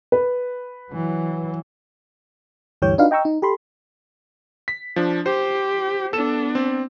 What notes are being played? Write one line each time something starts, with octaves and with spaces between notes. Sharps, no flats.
B4
E3 F#3
D2 G2 E3 G4 C#5 G6
D4 D#4 F4 F#4 B4 F5
D#5 G5 A#5 C#6 E6
D#4
G4 A4 B5 C6
B6
F3 D4
G4 C5
B3 D4 A4 E7
C4